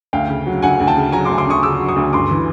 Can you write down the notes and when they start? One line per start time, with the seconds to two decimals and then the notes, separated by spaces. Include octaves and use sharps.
0.13 D2 F5 G5
0.29 C#3
0.47 F#3
0.62 D2 F#5 G#5
0.80 D2
0.87 G5 A5
0.96 C#3
1.12 F#3 G#5 A#5
1.25 C6 D6
1.29 D2
1.38 C6 D6
1.47 D2 C#6 D#6
1.63 C#3 D6 E6
1.80 F#3
1.88 C#6 D#6
1.96 D2
2.13 G2 C6 D6
2.31 E3